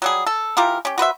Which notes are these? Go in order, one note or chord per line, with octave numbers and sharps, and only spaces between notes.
F#3 G3 G#4
A4
E3 F4 G4 A#4
C#4 G4
F#4 B4 C5 E5